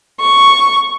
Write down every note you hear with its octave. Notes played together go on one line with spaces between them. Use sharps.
C#6